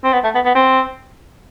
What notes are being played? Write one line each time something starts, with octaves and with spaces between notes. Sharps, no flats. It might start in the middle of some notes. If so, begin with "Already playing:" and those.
C4
B3
A3
B3
B3
C4